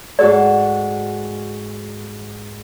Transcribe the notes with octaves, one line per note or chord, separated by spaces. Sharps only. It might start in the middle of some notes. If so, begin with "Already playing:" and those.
G#2 F#4 G#4 A4 D5